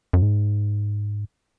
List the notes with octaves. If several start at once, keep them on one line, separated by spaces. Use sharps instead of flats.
F#2
G#2